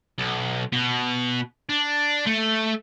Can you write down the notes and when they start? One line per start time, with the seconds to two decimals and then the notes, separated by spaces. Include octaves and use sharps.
0.18 B1
0.72 B2
1.69 D4
2.27 A3